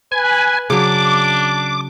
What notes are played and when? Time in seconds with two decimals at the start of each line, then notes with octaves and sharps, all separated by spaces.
0.12 B4 G#5
0.70 C#3 F#3 D4 D6